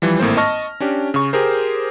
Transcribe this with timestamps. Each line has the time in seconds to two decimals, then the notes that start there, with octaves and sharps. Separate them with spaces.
0.02 E3 F3 G3
0.19 G#1 A2 A#3 C4 C5
0.37 D#5 A5 C#6 F6 A#6
0.80 C#4 D4 G4
1.14 C#3 C#6
1.33 G4 G#4 A#4 C5